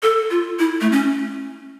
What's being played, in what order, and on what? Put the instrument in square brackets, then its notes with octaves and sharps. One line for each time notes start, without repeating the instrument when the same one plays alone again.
[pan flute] A4
F4
E4
A3
C#4